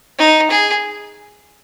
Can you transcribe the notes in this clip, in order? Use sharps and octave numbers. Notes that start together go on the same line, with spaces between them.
D#4
G#4